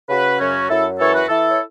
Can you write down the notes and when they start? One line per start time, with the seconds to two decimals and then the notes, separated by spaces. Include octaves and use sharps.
0.09 C#3 F#4 B4
0.39 F#2 C#4 F#4
0.69 F#2 E4 A4
0.99 E3 A4 C#5
1.14 F#4 B4
1.29 E3 E4 A4
1.49 C#5